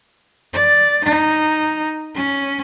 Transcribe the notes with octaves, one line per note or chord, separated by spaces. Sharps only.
D5
D#4
C#4